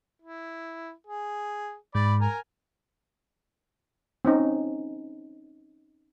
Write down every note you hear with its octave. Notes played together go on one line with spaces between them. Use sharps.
E4
G#4
G#2 D5 B5
A#4 G#5 A#5
C4 C#4 D#4